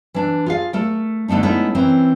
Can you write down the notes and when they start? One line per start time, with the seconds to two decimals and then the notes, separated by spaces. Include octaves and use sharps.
0.14 E3 D4
0.46 F4 G#4 F5
0.73 A3 A#4
1.28 D3 A3 B3 D4 D#4
1.43 G#3 A3 B3 C#4 D#4 E4
1.75 E3 C4 C#4 A#4